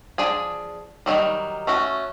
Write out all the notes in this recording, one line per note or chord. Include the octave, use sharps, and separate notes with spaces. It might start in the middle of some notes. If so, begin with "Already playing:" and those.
F3 D4 G#4 G#5
D#3 E3 F#3 G3
A3 C#4 F#4